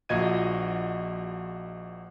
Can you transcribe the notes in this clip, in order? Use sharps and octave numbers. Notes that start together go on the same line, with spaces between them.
A#1 F3 F#4 D#5 G#6 D#7